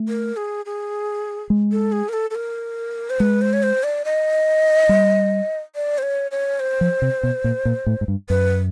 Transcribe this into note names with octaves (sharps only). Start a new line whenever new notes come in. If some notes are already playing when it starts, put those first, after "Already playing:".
Already playing: A3
A#4
G#4
G#4
G#3
A4
G#4
A#4
A4
A4
A#4
C5
G#3 B4
C5
C#5
C5
D5
D#5
G3
D5
C5
C#5
C#5
C5
F3
C3
B2
A#2
A#2
A2
G#2
G2
F#2 B4